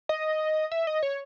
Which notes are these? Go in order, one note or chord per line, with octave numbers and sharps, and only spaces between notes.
D#5
E5
D#5
C#5